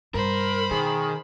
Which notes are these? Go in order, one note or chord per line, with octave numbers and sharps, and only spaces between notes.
G2 C3 A#4 C5 B5
B2 D#3 G#4